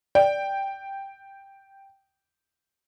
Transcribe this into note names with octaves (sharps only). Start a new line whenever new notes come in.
D5 G5